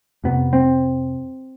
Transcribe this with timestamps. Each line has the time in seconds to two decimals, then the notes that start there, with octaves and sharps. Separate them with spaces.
0.24 F2 C3 B3
0.53 C4